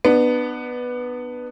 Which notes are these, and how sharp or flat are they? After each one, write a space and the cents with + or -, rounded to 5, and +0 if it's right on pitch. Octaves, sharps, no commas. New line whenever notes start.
B3 +0 D4 +35